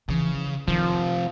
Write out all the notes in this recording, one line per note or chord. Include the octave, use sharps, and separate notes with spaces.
C#3 E3 F3
C3 D#3 F3 F4